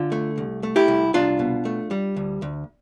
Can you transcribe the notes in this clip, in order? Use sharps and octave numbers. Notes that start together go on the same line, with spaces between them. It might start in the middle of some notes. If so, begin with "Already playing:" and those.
Already playing: D3 F4 A4
A3
C2
A3
E4 G4
C2
C2 D4 F4
B2
A3
G3
D2
D2